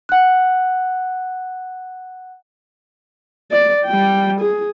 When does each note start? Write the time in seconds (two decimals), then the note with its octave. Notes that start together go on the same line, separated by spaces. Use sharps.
0.09 F#5 F#6
3.52 D5
3.86 G3 G5
4.40 G#4